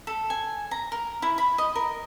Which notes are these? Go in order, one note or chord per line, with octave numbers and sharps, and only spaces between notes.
A4
G#5
A#5
A#4
E4
B5
D#5
A#4